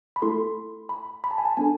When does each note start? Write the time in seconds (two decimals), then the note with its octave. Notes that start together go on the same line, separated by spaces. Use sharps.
0.16 B5
0.22 A3 E4 A4 C6
0.89 B5
1.24 B5
1.31 A5
1.38 G#5
1.45 A5
1.57 B3 D4 A4 G#5